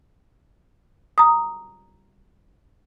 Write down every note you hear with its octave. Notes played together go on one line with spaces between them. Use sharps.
A#5 D#6